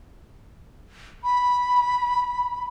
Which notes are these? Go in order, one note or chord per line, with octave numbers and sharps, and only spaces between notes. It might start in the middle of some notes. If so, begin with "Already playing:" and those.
B5